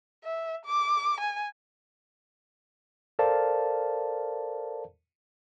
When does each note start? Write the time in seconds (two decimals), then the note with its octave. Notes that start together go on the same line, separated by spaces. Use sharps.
0.24 E5
0.65 D6
1.20 G#5
3.19 A4 A#4 C5 D5 F5 A5